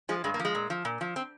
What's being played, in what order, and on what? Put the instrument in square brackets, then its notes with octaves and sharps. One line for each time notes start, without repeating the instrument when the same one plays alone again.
[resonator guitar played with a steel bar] F3 G#3
G2 G#3
A#3
F3
G#3
A#2
F3
A#2
F3
C4